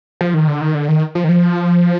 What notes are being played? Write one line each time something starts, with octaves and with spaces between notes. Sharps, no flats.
F3
D#3
D3
D#3
D3
D#3
F3
D#3
F3